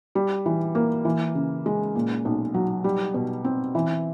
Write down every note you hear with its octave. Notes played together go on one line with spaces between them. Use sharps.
G3
E3
A#3
E3
C#3
G#3
A#2
B1
F#3
G3
B2
C4
E3